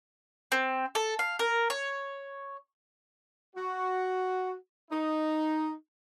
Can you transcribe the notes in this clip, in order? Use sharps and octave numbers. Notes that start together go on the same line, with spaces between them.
C4
A4
F5
A#4
C#5
F#4
D#4